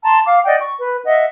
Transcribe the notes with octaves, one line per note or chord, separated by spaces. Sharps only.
A5 A#5 C6
F5 D6
D5 D#5 F#5 G5
C#6
B4
D#5 E5 F#5